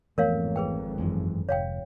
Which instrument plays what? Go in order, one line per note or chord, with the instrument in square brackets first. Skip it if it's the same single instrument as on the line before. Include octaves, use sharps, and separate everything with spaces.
[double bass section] G#1 F2 [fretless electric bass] E3 A3 B3 [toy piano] A#4 C#5 F5
[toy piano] G#4 B4 G5
[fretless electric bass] F#2 E3 G#3
[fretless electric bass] F1 [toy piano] C#5 F5 G5